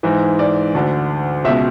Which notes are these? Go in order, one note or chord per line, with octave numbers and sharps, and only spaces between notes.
G#2 E3
D5
D2 D3
C#2 B2 E5